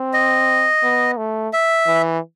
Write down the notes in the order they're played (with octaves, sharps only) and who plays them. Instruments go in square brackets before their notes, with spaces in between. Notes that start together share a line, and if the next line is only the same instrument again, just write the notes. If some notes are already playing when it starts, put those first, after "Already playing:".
Already playing: [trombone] C4
[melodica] D#5
[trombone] B3
A3
[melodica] E5
[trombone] E3